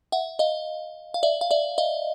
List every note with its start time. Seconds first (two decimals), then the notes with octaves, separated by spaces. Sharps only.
0.12 E5 F#5
0.39 D#5 F5
1.14 F5
1.23 D5 E5
1.41 F5
1.51 D5 E5
1.78 D#5 F5